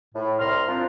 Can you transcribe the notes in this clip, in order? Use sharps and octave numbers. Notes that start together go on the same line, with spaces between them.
A2
C2 A#5 C6 F6
F3 C4 D4